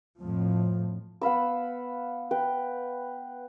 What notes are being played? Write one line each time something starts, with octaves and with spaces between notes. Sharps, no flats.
F2 A2 F3
B3 F5 B5 E6
B4 G5